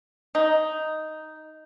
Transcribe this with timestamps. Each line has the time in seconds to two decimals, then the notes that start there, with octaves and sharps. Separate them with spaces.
0.35 D#4